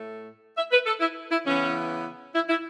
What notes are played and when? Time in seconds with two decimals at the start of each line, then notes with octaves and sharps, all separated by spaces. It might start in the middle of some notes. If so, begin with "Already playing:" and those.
Already playing: A2 A3
0.57 E5
0.71 B4
0.86 A4
1.00 E4
1.31 E4
1.45 C#3 E3 B3 C#4
2.34 E4
2.49 E4